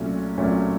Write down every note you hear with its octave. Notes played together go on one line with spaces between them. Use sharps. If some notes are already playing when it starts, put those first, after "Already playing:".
Already playing: C2 A#2 F#3 A3 C#4
C2 A#2 F#3 A3 C#4